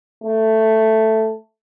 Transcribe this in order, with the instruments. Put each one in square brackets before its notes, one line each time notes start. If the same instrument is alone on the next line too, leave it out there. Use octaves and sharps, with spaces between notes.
[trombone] A3